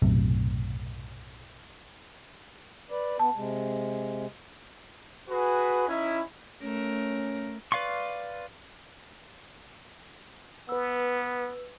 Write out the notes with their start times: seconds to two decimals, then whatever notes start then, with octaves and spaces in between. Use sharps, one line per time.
0.02 B1 F#2 A2 C3
2.90 B4 D5
3.19 B3 A5
3.36 C3 G#3
5.29 F#4 G#4 B4
5.88 C#4 D#4 E4
6.62 A3 C#4 A#4
7.72 B4 D5 F5 C6 C#6
10.69 B3 B4 E6